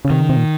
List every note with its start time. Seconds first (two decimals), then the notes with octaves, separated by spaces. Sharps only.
0.05 C#3
0.10 C3 D#3
0.22 C#3
0.29 C3
0.37 A#2